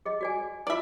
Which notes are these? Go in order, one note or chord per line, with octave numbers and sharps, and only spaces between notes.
G#4 D#5
F#4 D5 G#5
E4 F4 D5 E5